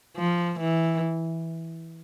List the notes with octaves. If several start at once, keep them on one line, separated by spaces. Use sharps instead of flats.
F3
E3